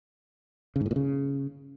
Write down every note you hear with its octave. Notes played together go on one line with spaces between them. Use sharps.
C#3
G#2
A2
A#2
C#3